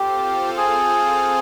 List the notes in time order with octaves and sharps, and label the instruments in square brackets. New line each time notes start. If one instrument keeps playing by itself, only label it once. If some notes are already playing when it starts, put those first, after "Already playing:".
Already playing: [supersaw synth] C4 F4 A4 C5 F5 [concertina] G4
[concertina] G#4